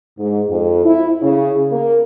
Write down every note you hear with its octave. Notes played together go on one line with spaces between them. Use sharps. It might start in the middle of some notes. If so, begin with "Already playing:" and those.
G#2
F2
E4
C#3
A#3